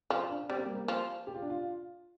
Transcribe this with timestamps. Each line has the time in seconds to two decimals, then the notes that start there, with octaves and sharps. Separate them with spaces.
0.10 F3 F4
0.30 D4
0.49 G3 C4
0.58 A#3
0.66 G3
0.75 A#3
0.88 F3
1.27 G4
1.35 F4
1.42 D4
1.50 F4